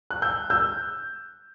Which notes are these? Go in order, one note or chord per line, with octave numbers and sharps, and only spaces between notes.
F#6
E6 G6
E6 G6